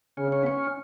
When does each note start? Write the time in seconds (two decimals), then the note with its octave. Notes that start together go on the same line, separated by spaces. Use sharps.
0.17 C#3 C#4
0.32 C#4
0.43 B3
0.46 C#4